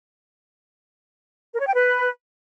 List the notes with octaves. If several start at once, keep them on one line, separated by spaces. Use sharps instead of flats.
A#4
C#5
G5
B4